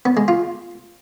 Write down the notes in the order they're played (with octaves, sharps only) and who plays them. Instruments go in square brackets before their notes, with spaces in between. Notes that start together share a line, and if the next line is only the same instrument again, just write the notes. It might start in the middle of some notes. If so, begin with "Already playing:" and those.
[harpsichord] B3
G#3
F4